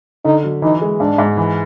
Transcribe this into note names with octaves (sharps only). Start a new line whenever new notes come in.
D3 D#4
F#3
E3 D#4
G#3
G#2 D4
G#2
E3